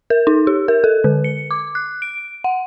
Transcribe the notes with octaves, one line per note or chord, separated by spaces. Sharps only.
A#4
D#4
G4
A#4
A4
D3
C#7
D6
F#6
D7
F#5